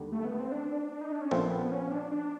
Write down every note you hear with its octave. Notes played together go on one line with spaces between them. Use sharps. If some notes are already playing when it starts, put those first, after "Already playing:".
Already playing: D#2 D3 G3
A3
B3
C4
D4
D4
D4
D#4
D4
C#4
A#1 A#2 F3 A3 B3 C4
C#4
D4
D4